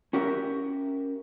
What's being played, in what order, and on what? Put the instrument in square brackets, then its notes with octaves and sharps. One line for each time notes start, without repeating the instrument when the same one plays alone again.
[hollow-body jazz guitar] C#4 F#4 G4 A#4 E5